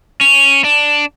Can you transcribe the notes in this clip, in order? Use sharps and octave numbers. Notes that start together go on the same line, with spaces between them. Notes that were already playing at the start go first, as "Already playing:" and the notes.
C#4
D4